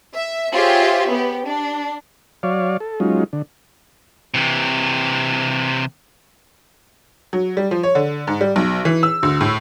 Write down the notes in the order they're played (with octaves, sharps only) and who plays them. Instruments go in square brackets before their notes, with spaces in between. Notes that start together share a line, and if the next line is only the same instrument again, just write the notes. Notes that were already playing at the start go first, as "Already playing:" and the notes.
[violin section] E5
F4 G4 G#4 C5 C#5 E5
B3 G4
D4
[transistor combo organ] F#3 C#5 D5 F5
A4
F#3 G#3 C#4 D#4 F4
D3
[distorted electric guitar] C3 E3
[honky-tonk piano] F#3
G3
F3
C#5
D3
G#2
G3
B1
E3
E6
D2
A2